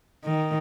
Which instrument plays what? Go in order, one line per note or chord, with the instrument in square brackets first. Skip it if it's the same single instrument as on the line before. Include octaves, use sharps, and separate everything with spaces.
[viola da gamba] D#3